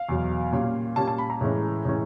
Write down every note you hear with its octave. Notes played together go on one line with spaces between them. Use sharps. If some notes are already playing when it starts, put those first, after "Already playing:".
Already playing: F5
E2 B2 F#3
A#2 G3 A#3 C#4
A#2 G3 A#3 C#4 A5
A5
B5
A#5
A2 E3 G#3 C#4
A2 E3 G#3 C#4